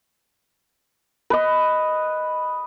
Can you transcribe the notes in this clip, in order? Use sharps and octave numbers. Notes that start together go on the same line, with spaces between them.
B4 D#5